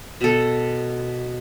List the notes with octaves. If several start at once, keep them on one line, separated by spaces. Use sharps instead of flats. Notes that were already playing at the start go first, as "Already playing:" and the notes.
B2 A4